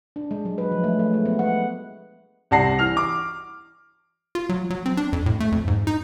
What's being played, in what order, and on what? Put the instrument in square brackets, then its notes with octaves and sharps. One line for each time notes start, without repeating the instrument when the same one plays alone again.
[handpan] D4
G#3
F#3
B4
F3
A3
A3
G#3
B3
F#5
[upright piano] C2 D5 F#5 A5 A#6 C7
E3 F6 F7
D6
[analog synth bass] F4
F#3
F#3
C4
D4
F2
A2
A3
F2
G#2
D#4